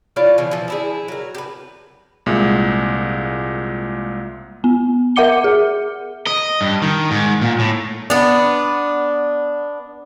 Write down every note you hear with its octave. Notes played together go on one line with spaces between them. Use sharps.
E4 F4 C#5 D5
B2 E3 F3
E3 F3
D4 E4 G#4
F#3 A#4
G4 B4
C2 A#2 G#3
B3
A#4 E5 F#5 D6 C#7 G7
G#4
D#5
G2
D#3
G#2
A#2
A2
B3 D4